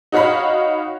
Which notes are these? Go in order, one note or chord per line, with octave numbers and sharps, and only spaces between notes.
D#4 F#4 C#5 F5 B5